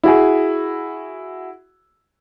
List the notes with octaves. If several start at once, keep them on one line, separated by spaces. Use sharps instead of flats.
E4 F#4 G#4